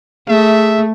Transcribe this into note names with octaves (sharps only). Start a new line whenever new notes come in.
A3 G#4 E5